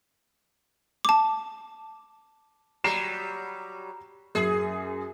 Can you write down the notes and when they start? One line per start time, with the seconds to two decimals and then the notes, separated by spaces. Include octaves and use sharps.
1.05 A5 D6
2.84 F#3 G3 A#5 C7 E7
4.35 F#2 G#4